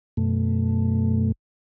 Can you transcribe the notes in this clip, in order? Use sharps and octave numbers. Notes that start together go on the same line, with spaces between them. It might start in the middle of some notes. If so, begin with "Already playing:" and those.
F#2 B2 A3